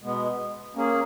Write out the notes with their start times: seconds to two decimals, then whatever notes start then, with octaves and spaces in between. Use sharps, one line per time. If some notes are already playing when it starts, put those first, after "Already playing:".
0.02 B2 G#3 B3
0.75 A#3 C#4 G#4